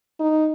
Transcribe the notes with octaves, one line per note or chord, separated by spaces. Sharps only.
D#4